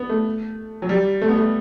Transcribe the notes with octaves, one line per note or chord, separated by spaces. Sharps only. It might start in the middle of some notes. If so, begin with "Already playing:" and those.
Already playing: B3
A3
F#3
G3
A3
B3
A3